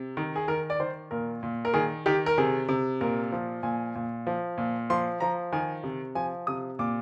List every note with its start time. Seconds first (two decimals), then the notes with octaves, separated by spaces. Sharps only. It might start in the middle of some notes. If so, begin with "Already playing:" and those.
Already playing: C3
0.17 D#3
0.36 G#4
0.48 D#3 A#4
0.70 D5
0.79 D#3 C5
1.11 A#2 A#4
1.43 A#2
1.65 A#4
1.74 D#3 G#4
2.06 D#3 G4
2.26 A#4
2.38 C3 G#4
2.68 C3
3.01 A#2 A#4
3.32 F3
3.63 A#2 G#5
3.95 A#2
4.27 F3
4.58 A#2
4.90 F3 C6
5.20 F3 A#5
5.52 D#3 G#5
5.83 C3
6.15 F3 G#5
6.47 C3 D#6
6.79 A#2 D6